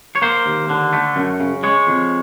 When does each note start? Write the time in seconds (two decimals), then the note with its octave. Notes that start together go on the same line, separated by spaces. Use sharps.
0.15 C#5
0.22 A#3 C5
0.46 D#2
0.69 D3
0.93 A3
1.16 F#2
1.40 C#3
1.63 G#3 C#5
1.87 F2